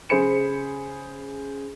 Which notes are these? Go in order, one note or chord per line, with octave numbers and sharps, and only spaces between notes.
C#3 G#4 C5 B5 C#7 E7